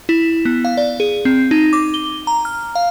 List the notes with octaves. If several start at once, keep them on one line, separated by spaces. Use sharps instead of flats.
E4
B3
F5
D5
G#4
C4
D#4
D6
G7
A#5
F6
F5